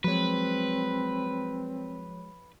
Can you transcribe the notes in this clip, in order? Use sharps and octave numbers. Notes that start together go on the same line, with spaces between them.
F3 F#3 G#3 C4 B4 C#5